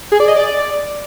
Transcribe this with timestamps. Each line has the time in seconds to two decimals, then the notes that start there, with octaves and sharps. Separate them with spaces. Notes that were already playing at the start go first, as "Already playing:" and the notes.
0.12 G#4
0.20 D5
0.28 D#5
0.36 D5